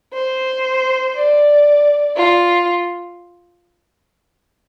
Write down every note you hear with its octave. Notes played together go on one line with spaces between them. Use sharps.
C5
D5
F4